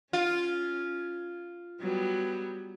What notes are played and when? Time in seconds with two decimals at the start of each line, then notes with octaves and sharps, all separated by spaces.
0.13 C#4 F4
1.81 F#3 G3 B3